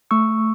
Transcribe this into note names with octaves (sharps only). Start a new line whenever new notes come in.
A3 C#6 E6